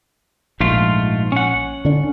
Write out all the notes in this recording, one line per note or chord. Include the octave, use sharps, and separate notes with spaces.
A#1 G#2 A3 F4
C#4 F#5
D3 D4